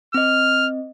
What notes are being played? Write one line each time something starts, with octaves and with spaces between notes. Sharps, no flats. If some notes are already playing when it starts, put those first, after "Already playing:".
C4 D#5 F6